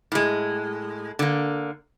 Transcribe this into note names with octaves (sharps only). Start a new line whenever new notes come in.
A2 G#3
D3 A#3